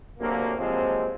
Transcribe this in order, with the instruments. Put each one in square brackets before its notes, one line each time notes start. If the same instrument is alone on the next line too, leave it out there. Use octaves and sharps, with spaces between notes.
[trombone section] D2 C3 F#3 A#3
C3 F3 F#3 G#3 A#3 C4